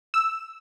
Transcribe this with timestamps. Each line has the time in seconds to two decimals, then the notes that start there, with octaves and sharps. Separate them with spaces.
0.14 E6